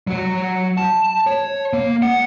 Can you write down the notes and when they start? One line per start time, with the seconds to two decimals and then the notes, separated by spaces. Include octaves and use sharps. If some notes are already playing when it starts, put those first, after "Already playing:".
0.07 F#3 F#4
0.77 A5
1.27 C#5
1.73 A#3
2.02 F#5